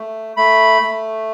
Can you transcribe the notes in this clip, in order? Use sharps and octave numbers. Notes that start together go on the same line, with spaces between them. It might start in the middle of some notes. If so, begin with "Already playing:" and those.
Already playing: A3
A3 B5
A3